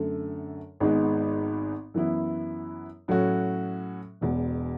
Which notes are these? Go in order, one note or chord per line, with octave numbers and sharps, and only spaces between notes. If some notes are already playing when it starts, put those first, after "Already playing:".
Already playing: F#2 D3 A3
G#1 G#2 G#3 B3
F#2 E3 B3 E4
A2 F#3 C#4 F#4
E1 E2 B2